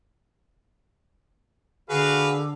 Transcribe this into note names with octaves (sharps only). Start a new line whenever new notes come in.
D3 F#4 G#4 B4 F5